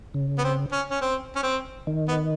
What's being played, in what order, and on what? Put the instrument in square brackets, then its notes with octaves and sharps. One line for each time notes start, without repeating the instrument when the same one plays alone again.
[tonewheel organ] C#3
[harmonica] B3
C4
C#4
C#4
C4
C#4
C4
[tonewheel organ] D#3
[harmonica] B3